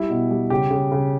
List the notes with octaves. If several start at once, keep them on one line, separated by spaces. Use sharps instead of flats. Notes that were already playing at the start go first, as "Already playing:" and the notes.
Already playing: G3 E4
B2
G3
C#3 G4
C#3
C#3